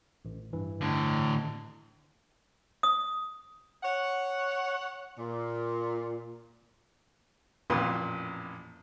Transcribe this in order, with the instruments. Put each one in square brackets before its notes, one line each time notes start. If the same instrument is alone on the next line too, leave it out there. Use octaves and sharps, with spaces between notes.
[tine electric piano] A1
G2 E3
[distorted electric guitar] A2 D3
[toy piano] D#6
[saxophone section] C#5 F#5
A#2
[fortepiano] A1 F2 A#2 B4 C6 D#6